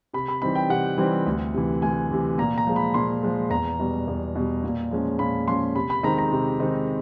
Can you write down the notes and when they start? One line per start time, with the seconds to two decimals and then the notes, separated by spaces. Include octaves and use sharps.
0.13 C3 B5
0.28 B5
0.42 E3 G3 C4 D#4 B5
0.55 G5
0.69 C3 F#5
0.97 E3 G3 C4 D#4
1.26 D2
1.54 C3 E3
1.82 D2 G#5
2.11 C3 E3
2.38 A#2 A#5
2.58 A#5
2.67 F3 G#3
2.76 B5
2.94 A#2 C6
3.23 F3 G#3
3.50 E2 A#5
3.80 B2 G3
4.08 E2
4.35 B2 G3
4.64 A#2
4.91 F3 G#3 C#4
5.19 A#2 B5
5.47 F3 G#3 C#4 C6
5.76 C3 B5
5.90 B5
6.03 D#3 G#3 C4 D#4 A#5
6.18 A#5
6.32 C3
6.60 D#3 G#3 C4 D#4